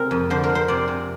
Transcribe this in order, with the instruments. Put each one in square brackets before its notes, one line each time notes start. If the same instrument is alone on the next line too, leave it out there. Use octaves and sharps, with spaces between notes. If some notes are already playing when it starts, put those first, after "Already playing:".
Already playing: [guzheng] C3 G#3 C4 A#4
F2
D3 C5
A#4
G#3
C5
C3 D5
C3